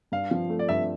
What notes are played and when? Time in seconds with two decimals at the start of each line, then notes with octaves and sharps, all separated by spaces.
0.12 G2 F5
0.31 F3
0.50 A3
0.59 D5
0.69 G2 E5